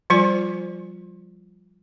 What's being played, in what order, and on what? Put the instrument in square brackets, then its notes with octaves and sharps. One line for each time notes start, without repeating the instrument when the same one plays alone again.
[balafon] F3 G3 F4 C5 D5 G#5